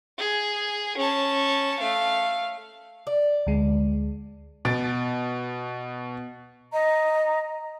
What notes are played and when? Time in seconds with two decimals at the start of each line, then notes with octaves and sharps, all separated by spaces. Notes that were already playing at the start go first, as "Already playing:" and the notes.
0.19 G#4
0.97 C#4 A5
1.79 A3 F5
3.07 D5
3.47 D2 G#3
4.65 B2 A6 D7
6.73 D#5 A#5